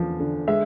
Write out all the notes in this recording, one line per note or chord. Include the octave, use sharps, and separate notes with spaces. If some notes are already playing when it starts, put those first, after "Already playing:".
Already playing: E2 D3 F3
D3
G#3 E5